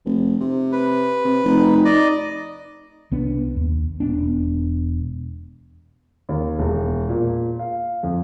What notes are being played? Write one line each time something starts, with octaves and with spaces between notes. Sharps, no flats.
F1
C3
B4
C3
F1 D#4
D5 D#5
C2 B3 D4
D#2
E1 B3 D4
D#2
E1
A#2
F5
F2